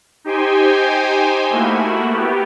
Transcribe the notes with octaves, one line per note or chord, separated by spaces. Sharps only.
D#4 G4 C5 G5 G#5
A3 A#3 E4 F#4
B3 G4